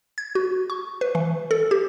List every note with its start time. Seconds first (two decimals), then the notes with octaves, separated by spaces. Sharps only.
0.18 G#6
0.35 F#4
0.70 C#6
1.01 B4
1.15 E3
1.51 A4
1.71 G4